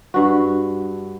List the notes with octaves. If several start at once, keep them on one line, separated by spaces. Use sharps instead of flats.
G2 F#4